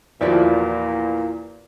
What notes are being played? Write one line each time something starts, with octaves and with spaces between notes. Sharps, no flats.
E2 A#2 F3 F#4 D5 E5